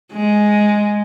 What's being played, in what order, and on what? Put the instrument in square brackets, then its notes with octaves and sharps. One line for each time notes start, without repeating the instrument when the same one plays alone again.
[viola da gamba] G#3